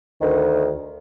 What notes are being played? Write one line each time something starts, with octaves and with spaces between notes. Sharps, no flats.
D2 D#3